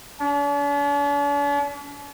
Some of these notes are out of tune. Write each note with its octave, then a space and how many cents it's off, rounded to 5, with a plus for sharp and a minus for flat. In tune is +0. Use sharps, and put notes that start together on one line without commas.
D4 -45